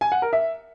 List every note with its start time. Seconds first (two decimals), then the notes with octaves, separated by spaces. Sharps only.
0.01 G#5
0.12 F#5
0.22 A#4
0.33 E5